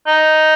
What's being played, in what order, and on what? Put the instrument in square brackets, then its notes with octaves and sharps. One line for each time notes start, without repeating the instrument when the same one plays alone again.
[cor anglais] D#4